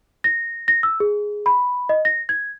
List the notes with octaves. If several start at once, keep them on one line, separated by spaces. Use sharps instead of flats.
A#6
A#6
E6
G#4
B5
D#5
A#6
G#6